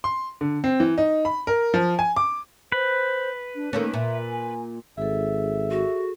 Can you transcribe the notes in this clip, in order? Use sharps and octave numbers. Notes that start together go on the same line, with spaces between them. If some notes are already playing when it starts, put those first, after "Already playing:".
C6
D3
C4
E3
D#4
B5
A#4
F3
G#5
D6
B4 C5
D4
D#3 A#3 C#4 A4
A#2 E5
G#5
G#1 G#4 A4 E5
F#4